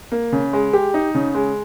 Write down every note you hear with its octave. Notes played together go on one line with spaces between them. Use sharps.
A#3
C#3
G#3
G4
D#4
C#3
G#3